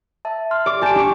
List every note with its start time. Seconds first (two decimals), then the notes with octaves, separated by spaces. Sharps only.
0.25 E5 A5
0.51 C6 F6
0.66 G4 D5 D6
0.82 G4 G#5 A5 D7
0.95 D4 C#6